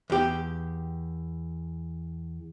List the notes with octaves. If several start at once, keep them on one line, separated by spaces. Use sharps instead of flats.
E2 G4